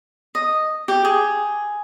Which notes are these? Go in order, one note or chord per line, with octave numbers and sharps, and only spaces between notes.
D#5
G4
G#4